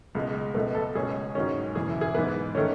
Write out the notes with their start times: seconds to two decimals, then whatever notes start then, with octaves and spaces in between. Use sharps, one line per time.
0.15 C#2 B2 G#3
0.54 C#2 B2 A3 B4
0.75 A4
0.95 C#2 B2 G#3 C#4 G#4
1.35 G#2 D#3 F#3 C#4
1.75 E1 E2 C#3 G#4
1.89 E4
2.01 G#4
2.15 G#2 E3 B3 B4
2.55 D#3 A3 C#4